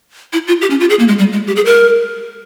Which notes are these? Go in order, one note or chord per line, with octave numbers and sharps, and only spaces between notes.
E4
F4
G4
C#4
F4
G#4
A#3
G#3
G3
G#3
G4
G#4
A#4